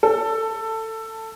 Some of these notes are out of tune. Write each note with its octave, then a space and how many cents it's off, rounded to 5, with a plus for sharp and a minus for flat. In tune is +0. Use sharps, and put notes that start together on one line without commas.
A4 +15